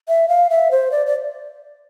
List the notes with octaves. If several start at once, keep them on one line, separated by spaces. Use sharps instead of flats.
E5
F5
E5
C5
D5
D5